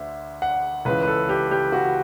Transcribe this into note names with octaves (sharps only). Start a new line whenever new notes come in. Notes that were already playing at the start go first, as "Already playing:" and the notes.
Already playing: D2 D3 E5
F#5
C#2 C#3 E3 B4
B4
A4
G4
G4
F#4